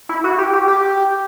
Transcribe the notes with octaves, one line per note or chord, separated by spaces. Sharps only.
E4
F#4
G4
G4
G4